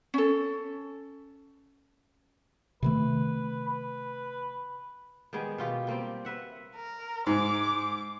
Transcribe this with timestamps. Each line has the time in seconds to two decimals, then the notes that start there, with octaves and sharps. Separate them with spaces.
0.14 C#4 A4
2.83 C3 D#3 A3 B4
3.67 B4
5.33 D#3 G3 G#3 B3
5.58 B2 F4 G4
5.87 G3 A#3 C4 G4
6.25 B4 E5 F#5
6.76 A#4
7.27 G#2 D6